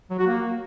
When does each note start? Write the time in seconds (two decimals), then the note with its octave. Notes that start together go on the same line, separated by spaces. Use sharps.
0.10 F#3
0.19 F#4
0.27 A#3